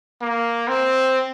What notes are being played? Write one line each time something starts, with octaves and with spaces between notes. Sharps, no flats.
A#3
C4